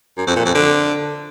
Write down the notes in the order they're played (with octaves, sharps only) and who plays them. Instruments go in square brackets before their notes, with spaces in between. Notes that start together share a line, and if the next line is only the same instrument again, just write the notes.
[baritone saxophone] F#2
F2
A#2
F2
D3